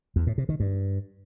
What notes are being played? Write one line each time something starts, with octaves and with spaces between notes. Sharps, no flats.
E2
A2
C3
D#3
G2